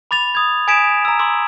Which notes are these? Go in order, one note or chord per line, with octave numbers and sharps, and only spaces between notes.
B5 D6 A6 F7
D#6 G#6
G#5 D#6 G#6 B6 D7 E7
A#5 E6
C6 D6 E6